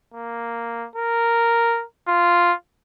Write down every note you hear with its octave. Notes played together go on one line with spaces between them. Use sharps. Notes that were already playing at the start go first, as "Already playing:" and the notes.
A#3
A#4
F4